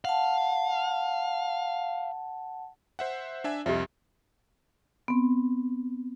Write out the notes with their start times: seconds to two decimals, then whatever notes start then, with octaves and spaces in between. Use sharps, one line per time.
0.05 F5 F#5 A5
2.99 C5 E5 F#5
3.44 D4 E5 G#5
3.66 C2 F2 G4 D#5 E5
5.08 B3 C4